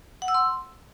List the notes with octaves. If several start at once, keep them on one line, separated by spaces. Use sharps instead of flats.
F#5
E6
C6